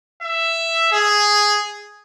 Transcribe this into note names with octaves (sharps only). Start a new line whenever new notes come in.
E5
G#4